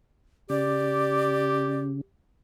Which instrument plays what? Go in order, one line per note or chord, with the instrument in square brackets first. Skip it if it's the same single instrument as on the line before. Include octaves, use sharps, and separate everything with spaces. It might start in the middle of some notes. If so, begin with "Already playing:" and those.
[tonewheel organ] C#3 [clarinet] G4 [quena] D5